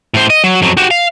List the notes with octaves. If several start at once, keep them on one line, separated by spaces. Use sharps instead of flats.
A2 C5
D#5
F#3
F2 F#3
F#4 G4
F5